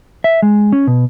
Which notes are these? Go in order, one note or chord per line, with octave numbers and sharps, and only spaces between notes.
E5
G#3
C#4
B2